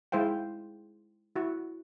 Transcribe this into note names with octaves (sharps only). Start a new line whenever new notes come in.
G#3 E4 C5 F5 G5
E4 F#4